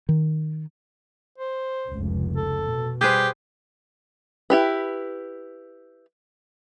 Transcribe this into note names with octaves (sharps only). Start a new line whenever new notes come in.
D#3
C5
F1 C#2
A4
B2
G3 G4 G#4 B4 C5
E4 G4 B4